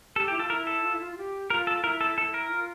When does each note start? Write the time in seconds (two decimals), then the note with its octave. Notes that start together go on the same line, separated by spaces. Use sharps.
0.16 G4 A4
0.28 G4
0.31 E4
0.38 F4 A4
0.50 E4 A#4
0.67 A4
0.83 F4
0.93 E4
1.00 F4
1.12 F4
1.18 G4
1.50 F4 A#4
1.67 A4
1.83 E4 A#4
2.01 A4
2.18 E4 A4
2.34 A#4
2.51 F4